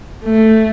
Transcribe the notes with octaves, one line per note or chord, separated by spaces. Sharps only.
A3